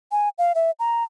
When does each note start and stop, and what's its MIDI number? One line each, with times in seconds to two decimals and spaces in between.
0.12 0.29 80
0.38 0.52 77
0.55 0.71 76
0.79 1.04 82